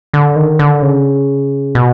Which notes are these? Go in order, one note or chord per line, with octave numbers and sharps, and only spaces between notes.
D3
D#3
D3
C#3
B2